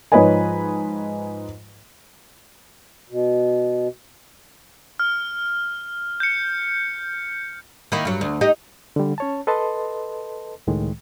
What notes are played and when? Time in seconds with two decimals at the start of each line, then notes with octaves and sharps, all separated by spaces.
0.12 G#2 F3 B4 C#5 D#5 G#5
3.10 B2
5.00 F6
6.20 G6 C#7
7.92 D#3 A#3 E4
8.05 G2 F#3
8.21 D2
8.41 D#4 G4 D#5
8.96 D3 G3
9.18 C#4 C#5 A5
9.47 A4 B4 D#5 A5 C6
10.67 C#2 A2 D#3 G#3